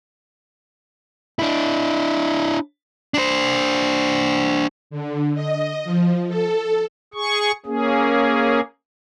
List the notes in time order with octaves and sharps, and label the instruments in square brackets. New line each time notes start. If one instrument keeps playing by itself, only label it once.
[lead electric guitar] D4 E4
D4 C5
[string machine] D3
D#5
F3
A4
[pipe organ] G#4 C#6
A#3 C#4 G#4